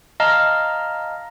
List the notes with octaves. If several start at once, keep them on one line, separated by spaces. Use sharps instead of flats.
D#5 F5 A5 A#5 F6